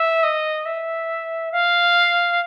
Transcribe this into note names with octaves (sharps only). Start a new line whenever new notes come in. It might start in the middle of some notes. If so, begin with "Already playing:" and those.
Already playing: E5
D#5
E5
F5